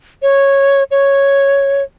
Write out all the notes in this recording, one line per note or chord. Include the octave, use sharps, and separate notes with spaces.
C#5
C#5